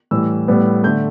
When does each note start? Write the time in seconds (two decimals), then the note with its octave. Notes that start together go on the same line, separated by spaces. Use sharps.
0.11 A2 E3 G3 E6
0.48 A2 G3 B3
0.84 D3 A3 G6